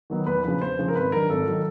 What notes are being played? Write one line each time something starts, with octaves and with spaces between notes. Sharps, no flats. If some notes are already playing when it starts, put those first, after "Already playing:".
D#3 F#3 B3
E2 B4
C#3 F3 B4
E2 C5
C#3 F3
A#4
G#1 B4
G2 D#3 F#3 A#4
G#1 A4
D#3 F#3